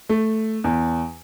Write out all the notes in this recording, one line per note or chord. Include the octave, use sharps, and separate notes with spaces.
A3
E2